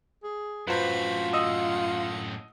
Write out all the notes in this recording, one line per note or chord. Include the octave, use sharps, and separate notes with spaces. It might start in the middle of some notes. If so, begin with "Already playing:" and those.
G#4
F#2 A2 F4 F#4 B4 C5 B5
D#5 F#5 D#6 E6